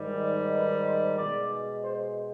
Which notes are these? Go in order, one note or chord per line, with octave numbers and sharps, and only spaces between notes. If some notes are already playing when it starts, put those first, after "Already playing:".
Already playing: G#2 D#3 G3
D5
B4
C5
B2 G#3 D5
C5